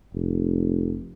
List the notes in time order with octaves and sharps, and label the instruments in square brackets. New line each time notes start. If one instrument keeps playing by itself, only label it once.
[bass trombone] F1